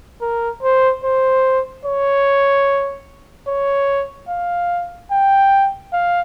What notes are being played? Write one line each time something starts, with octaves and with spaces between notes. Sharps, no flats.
A#4
C5
C5
C#5
C#5
F5
G5
F5